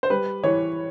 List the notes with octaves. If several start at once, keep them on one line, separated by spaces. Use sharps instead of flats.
C5
G3 B4
E3 C#5